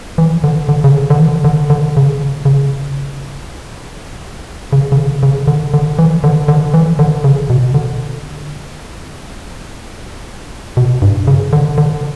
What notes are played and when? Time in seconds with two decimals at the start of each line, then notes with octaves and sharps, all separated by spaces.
0.18 E3
0.44 D3
0.69 D3
0.84 C#3
0.94 D3
1.10 D3
1.19 E3
1.44 D3
1.70 D3
1.97 C#3
2.08 D3
2.45 C#3
4.73 C#3
4.92 C#3
4.97 D3
5.23 C#3
5.47 D3
5.74 D3
5.99 E3
6.24 D3
6.48 D3
6.74 E3
6.99 D3
7.24 C#3
7.50 B2
7.74 D3
10.77 B2
11.02 G2
11.27 C#3
11.53 D3
11.78 D3